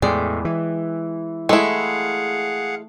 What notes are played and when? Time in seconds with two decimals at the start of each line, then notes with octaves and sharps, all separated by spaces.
0.02 E2 A2 G#3 D5 G5
0.45 E3
1.49 G#3 A3 E4 G#4 F5 F#5